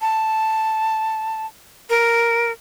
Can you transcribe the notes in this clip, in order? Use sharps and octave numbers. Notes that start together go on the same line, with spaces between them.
A5
A#4